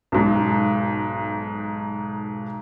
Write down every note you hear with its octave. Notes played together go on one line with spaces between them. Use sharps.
B1 G#2